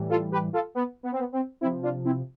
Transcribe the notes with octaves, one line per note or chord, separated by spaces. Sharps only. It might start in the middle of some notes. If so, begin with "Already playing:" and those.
Already playing: A2 E3 G3
F4 A4
G4 B4
F4 A4
B3
B3
C4
B3
C4
C3 F3 C4 E4
D4 F4
C4 E4